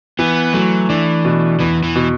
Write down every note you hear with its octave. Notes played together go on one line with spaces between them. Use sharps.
E3 B3
F#3 A3
E3 D4
B2
E2 E3
E3
B2